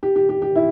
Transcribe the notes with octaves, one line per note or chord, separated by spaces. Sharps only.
G4
G4
G4
G4
E4